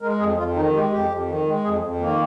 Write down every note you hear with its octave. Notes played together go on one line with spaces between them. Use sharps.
G#3 A#4
F2 G#4
F2 F4
D#3 D#4
G#3 G4
F2 G4
F2
D#3
G#3
F2 G#4
F2
D#3 A#3